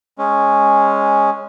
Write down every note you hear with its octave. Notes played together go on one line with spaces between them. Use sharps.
G#3 C#4